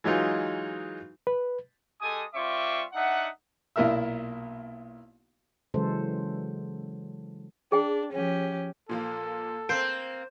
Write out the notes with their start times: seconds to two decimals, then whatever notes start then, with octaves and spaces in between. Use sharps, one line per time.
0.04 E3 F#3 G#3 D#4 F4
1.27 B4
2.02 G#3 G4 A4 G#5 D#6
2.34 G3 C4 F4 E5 C#6 D6
2.93 D4 D#4 E5 F#5
3.76 B1 A#2 E4 A#4 E5 E6
5.74 C#3 E3 F#3 G#3 A4 C5
7.72 D4 G#4 G5
8.12 F3 C#4 G4
8.89 A#2 F3 A#3 A4
9.69 A#3 C4 C5 D7